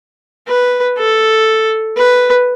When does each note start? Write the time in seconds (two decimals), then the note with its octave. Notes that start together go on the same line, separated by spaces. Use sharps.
0.48 B4
0.98 A4
1.97 B4